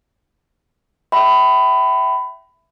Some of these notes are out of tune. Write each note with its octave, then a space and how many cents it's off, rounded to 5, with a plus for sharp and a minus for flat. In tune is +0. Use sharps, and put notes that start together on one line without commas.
E5 +5 G5 -40 B5 +20